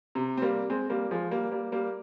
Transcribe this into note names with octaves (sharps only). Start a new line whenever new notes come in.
C3
C4
G3 A#3
G#3 C4
G3 A#3
F3 G#3
G3 A#3
G3 A#3
G3 A#3